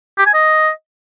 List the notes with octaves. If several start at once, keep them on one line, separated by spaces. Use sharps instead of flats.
G4
G#5
D#5